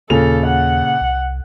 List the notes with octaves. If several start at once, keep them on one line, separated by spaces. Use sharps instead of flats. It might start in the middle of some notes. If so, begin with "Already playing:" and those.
D#2 A#2 C#3 A4 F7
F#5
C2